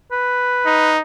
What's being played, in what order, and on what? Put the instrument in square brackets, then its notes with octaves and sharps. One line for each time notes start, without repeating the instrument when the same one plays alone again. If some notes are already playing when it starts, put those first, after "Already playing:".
[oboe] B4
[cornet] D#4